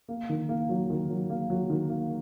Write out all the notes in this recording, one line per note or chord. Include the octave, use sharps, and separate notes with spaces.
A#3
D#3
A#3
F#3
D#3
F#3
A#3
F#3
D#3
A#3